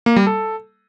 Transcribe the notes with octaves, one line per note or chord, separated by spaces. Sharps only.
A#3
G3
A4